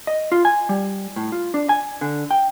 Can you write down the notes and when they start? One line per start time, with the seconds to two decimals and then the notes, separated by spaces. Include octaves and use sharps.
0.07 D#5
0.32 F4
0.45 G#5
0.69 G3
1.16 A2
1.32 F4
1.54 D4
1.69 G#5
2.01 D3
2.31 G5